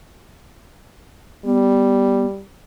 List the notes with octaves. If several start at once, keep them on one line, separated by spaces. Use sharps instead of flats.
G3 B3